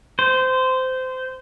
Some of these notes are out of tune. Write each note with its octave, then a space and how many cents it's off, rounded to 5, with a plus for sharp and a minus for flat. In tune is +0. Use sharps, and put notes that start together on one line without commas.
C5 -20